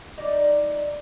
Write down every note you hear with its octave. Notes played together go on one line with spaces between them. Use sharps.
D#4 D5